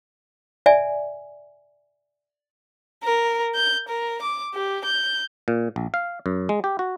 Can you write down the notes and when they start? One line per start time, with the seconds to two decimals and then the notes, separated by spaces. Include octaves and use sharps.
0.66 D5 E5 G#5
3.04 A#4
3.55 G6
3.89 A#4
4.22 D6
4.54 G4
4.84 G6
5.48 A#2
5.76 A#1
5.94 F5
6.26 F#2
6.49 G#3
6.64 G4
6.79 F#4